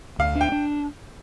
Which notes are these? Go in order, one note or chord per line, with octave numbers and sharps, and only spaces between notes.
D2 F5
D4
G5
D4